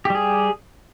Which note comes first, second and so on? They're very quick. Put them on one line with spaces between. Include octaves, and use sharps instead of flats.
G4 G3 G#4